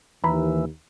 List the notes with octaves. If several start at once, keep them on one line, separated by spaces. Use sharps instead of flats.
D#2 E3 A#5 B5